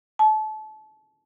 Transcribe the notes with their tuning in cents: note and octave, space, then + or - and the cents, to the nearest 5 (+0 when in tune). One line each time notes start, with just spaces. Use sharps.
A5 -30